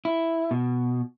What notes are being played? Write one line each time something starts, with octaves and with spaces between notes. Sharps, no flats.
E4
B2